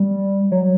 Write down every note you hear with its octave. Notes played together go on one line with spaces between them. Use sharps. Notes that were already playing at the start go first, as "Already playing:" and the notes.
Already playing: G3
F#3